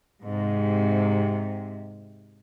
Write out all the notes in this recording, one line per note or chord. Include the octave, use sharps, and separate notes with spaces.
G#2 C3